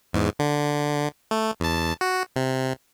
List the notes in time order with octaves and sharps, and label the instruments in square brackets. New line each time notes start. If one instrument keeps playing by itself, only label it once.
[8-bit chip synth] E2 G#2
D3
A3
E2 A5
F#4
C3